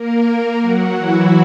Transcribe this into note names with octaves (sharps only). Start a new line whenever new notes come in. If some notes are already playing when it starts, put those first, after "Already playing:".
Already playing: A#3 A#4
F#3 F#4
E3 E4